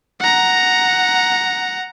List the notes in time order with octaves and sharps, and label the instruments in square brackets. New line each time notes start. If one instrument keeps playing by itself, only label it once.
[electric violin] F#5 A#5